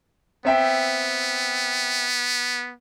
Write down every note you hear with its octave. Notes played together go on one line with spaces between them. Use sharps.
B3 C4 E5 G5